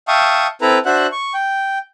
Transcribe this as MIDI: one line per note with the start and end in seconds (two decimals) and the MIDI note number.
0.08 0.47 76
0.08 0.47 77
0.08 0.47 79
0.08 0.47 81
0.08 0.47 85
0.08 0.47 87
0.62 0.79 60
0.62 0.79 64
0.62 0.79 69
0.62 0.79 71
0.62 0.79 82
0.86 1.07 62
0.86 1.07 66
0.86 1.07 72
0.86 1.07 76
0.86 1.07 78
0.86 1.07 90
1.12 1.33 85
1.34 1.79 79